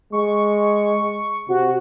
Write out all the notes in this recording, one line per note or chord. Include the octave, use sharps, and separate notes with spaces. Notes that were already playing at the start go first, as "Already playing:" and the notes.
G#3 C#6
C3 F#4